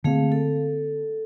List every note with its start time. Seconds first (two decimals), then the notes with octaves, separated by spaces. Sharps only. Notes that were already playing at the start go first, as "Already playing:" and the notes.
0.04 D3 A3 A#3 C4 G#4 F5
0.32 A4